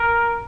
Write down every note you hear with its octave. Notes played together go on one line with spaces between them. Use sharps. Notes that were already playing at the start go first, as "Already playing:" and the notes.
Already playing: A#4